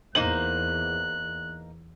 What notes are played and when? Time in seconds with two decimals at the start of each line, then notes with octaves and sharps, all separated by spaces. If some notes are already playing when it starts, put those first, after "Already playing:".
0.15 E2 A#3 D#4 C5 F#6 F#7